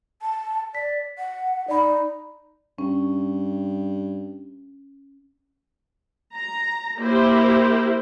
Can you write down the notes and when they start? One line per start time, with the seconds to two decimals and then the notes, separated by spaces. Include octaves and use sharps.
0.22 A5
0.75 D5 B6
1.18 F#5
1.68 D#4 D5 B5
2.78 G2 C#4
6.34 A#5
6.99 A#3 E4 G4 A#4 C5